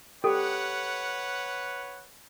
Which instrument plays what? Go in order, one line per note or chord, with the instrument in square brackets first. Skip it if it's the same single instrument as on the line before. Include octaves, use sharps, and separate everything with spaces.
[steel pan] G4 [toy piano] A4 [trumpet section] B4 C#5 F#5